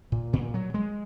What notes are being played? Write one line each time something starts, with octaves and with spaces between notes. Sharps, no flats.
A#2
A#2
F#3
G#3